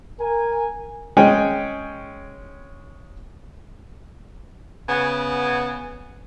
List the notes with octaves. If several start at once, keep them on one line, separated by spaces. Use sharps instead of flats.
A#4 G#5
G#3 C#4 G#4 C#5 G5 G#5
C#3 B3